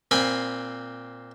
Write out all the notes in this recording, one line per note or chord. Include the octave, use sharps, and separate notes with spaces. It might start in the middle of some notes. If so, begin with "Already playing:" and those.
A#2 C4 G#5 B5